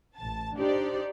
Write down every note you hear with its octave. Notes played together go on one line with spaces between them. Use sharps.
A1 A5
D4 D#4 G4 C5 D5